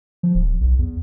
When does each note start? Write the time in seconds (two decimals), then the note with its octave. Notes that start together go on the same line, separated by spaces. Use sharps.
0.23 F3
0.35 D1
0.61 B1
0.79 E2